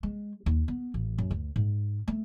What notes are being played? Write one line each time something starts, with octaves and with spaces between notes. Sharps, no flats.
G#3
D#2
B3
A1
F#2
D2
G#2
A3